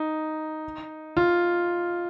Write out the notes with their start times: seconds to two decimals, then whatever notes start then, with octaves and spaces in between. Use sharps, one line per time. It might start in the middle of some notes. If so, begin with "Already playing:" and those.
Already playing: D#4
1.17 F4